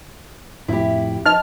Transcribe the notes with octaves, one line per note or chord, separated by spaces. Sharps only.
F2 A2 C4 E4 G4
D#4 D#5 F6